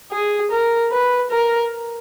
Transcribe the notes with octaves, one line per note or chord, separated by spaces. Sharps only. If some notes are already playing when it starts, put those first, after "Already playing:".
G#4
A#4
B4
A#4